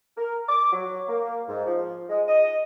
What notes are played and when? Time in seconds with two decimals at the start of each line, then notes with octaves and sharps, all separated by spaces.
0.17 A#4
0.49 D6
0.72 F#3
1.08 A#3
1.48 G#2
1.66 F3
2.09 G#3
2.28 D#5